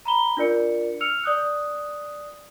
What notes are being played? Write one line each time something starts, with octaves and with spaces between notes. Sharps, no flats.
A#5 B5 G7
D4 F4 A#4 D5 C#7
E6 F6 C#7 F7
D5 D#6 F#6